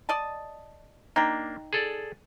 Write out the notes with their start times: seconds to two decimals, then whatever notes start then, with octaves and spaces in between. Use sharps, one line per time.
0.09 D5 D#5 A5
1.16 A#3 D4 D#4 G5
1.73 G#4 A4 D5